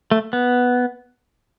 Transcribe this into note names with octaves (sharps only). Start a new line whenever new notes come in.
A3
B3